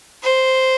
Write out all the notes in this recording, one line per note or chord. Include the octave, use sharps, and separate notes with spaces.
C5